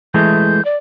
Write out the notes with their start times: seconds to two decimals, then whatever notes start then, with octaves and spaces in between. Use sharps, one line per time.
0.14 E3 G#3 A3 G6
0.65 D5